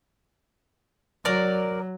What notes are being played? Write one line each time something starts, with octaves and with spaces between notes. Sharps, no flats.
F#3 A#4 D5